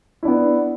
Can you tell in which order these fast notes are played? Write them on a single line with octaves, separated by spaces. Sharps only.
E4 D4 B3